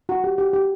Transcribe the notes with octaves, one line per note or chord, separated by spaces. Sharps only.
F#4
G4
G4
G4